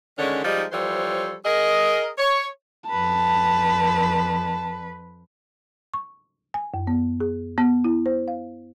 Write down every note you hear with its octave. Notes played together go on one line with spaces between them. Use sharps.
D3 D#3 G#3 C#4
F3 G3 G#3 D#4
E3 F3 G3 A4 C5 C#5
G#4 A#4 D#5
C#5
F2 B4 A5
C#6
G#5
F#2
B3
G#4
B3
E4
C5
F5